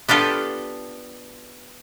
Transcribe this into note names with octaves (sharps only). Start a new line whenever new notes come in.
B3 D4 F4 G4 A4